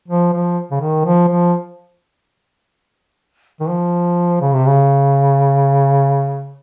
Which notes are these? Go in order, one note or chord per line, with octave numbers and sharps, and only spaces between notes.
F3
F3
C#3
D#3
F3
F3
D#3
F3
C#3
C3
C#3